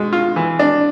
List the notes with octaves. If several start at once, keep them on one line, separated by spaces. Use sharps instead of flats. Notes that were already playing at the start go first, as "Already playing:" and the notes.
Already playing: B2 G#3
F4
E3
D4